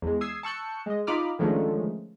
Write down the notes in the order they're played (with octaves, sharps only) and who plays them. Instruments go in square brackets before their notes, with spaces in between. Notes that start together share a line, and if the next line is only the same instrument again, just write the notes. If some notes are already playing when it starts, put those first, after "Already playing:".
[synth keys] E2 G#3
D#6 E6 G#6 C7
A5 C#6 E6 F#6 G6 C#7
G#3 D#5
D#4 F4 B5 D6 D#6 F6
D3 D#3 F3 G#3 A3 C#4